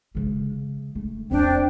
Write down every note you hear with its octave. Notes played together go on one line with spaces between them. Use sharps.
C#3 G#3
A3
E2 C4 D4 D#4 G5